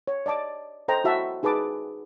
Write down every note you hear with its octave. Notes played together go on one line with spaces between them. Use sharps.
C#5
D5 D#5 A5 D6
A4 C5 D#5 G5 A#5
E4 F#4 E5 F#5 A5
D#4 G#4 B4 A5 D6